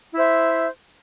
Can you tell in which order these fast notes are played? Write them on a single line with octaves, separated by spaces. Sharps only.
E4 C5 E5